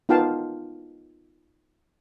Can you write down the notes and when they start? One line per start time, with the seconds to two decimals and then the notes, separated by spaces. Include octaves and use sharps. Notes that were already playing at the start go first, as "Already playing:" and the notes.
0.09 B3 D#4 F4 F5 G5 A5